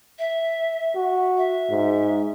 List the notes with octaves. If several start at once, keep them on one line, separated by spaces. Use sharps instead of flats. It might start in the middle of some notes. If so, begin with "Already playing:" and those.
E5
F#4
E5
G#2